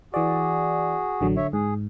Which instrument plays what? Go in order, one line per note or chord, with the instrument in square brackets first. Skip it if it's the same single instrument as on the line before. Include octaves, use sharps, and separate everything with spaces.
[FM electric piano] E3 D5 [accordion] F#4 G#4
[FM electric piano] A1 D3 F#3
[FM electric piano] D3 [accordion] C#5 E5
[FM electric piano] G#2 [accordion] G#4